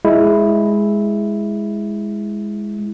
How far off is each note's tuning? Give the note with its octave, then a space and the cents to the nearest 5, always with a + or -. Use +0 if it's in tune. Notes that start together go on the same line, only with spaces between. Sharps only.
G#3 +0 E4 +0